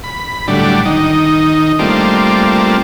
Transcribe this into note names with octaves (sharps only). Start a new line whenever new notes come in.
B5
A2 D3 F#3 G3 D4
D#3 D#4
G3 A3 A#3 C4 D4 F4